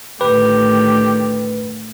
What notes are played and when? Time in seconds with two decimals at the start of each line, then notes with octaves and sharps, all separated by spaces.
0.21 A2 D3 D#3 G4 B4